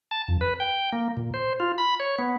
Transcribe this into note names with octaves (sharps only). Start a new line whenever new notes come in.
A5
F2
B4
G5
A#3
A#2
C5
F4
B5
C#5
B3